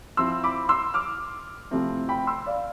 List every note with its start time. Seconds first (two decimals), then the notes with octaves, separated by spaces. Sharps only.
0.17 F3 C4 E4 C6 E6
0.44 B5 D6
0.69 C6 E6
0.94 D6 F6
1.71 C3 F3 A3 C4 E4
2.09 G5 B5
2.27 C6 E6
2.46 D5 F5